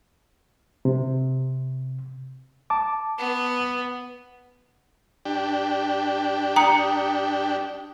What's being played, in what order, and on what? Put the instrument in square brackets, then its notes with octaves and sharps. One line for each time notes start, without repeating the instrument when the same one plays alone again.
[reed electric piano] C3
A5 D6
[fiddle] B3
[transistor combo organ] D4 G4
[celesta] G5 D#6 C#7 [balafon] A#5